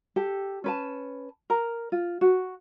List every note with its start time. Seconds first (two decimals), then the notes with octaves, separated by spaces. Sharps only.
0.16 G4 A4
0.64 C#4 B4 A5
1.50 A#4 A#5
1.92 F4
2.21 F#4